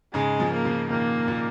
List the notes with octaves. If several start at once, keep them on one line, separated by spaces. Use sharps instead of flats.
G#2 C#3 G#3
C#3 F3
A#3
C#3 F3
A#2 D#3 A#3
A#2